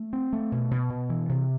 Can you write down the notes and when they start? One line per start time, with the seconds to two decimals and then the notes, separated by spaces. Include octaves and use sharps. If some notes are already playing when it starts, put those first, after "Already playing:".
Already playing: A3
0.13 C4
0.33 A3
0.52 B2
0.71 B2
0.90 B2
1.10 E3
1.29 C3